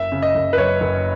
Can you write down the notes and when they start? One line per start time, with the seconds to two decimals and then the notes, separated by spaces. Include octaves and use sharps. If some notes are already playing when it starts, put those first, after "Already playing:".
Already playing: F#1 E5
0.12 C#3
0.22 D#5
0.35 F#1
0.53 B4
0.57 F#2 C#5
0.81 F#1